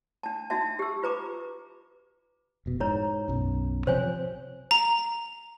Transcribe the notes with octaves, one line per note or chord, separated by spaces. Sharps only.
D4 A5
D4 D#4 F#4 E5 A5
G4 E6
F4 B4 A#5 D6
F1 B2
G#2 E4 C#5 A#5
B1 F#2
C3 F3 C4 C5 C#5 G#5
A#5